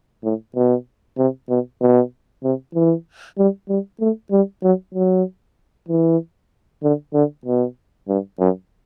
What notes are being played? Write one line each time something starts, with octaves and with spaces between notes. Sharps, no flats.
A2
B2
C3
B2
B2
C3
E3
G3
G3
A3
G3
F#3
F#3
E3
D3
D3
B2
G2
F#2